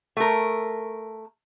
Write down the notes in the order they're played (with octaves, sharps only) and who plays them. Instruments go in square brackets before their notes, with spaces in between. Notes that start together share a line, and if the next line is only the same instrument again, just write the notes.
[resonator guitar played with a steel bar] A3 A#4